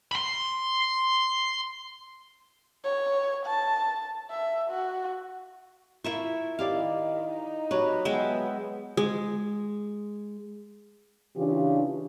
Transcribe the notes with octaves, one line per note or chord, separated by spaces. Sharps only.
B5 C6
C#5
A5
E5
F#4
E4 F4 A#4 E5 C#6
D#3 E4 G4 D5 F5
D#4
F#3 G4 B4 C#5
G#3 B3 E5 G5
G#3
C#3 E3 D4 F4 G4